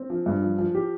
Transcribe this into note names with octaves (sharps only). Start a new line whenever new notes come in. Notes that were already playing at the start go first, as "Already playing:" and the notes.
Already playing: C4
F3
G2
F3
F3
G4